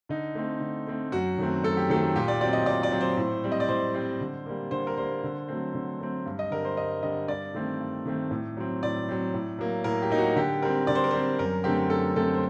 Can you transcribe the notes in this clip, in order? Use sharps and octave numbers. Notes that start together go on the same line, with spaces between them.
D3 D#4
A3 C4
D3
A3 C4
F#2 F#4
D#3 F#3 A3 C4
F#2 A4
G4
D#3 F#3 A3 C4 A4
A#2 G4
D5
F#3 C4 D5
D#5
A#2 D5
D5
F#3 C4
C5
A2
G3 C4
D#5
D5
A2 C5
G3 C4
D3
G3 A#3
D3 C5
A#4
G3 A#3 C5
D3
F#3 A3 C4
D3
F#3 A3 C4
G2
D#5
D3 G3 A#4
C5
G2 D#5
D3 G3 D#5
G2 D5
D#3 A3 C4
G2
D#3 A3 C4
A2
F#3 C4
A2 D5
F#3 C4
A2
F#3 A#3
A2 A#4
G4
F#3 A#3 D#4
F#4
D3 G4
G3 C4 A#4
D3 D5
C5
A#4
G3 C4 C5
F#2 A#4
D3 A3 C4 G4
F#2 A4
D3 A3 C4 A4
C5